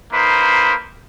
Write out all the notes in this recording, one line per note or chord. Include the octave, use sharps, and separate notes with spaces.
A#3 D#4 B4 C5